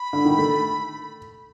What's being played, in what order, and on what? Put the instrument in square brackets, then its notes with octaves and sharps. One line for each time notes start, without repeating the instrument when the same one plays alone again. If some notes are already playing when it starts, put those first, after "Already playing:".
Already playing: [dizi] B5
[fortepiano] D3
D#3
A3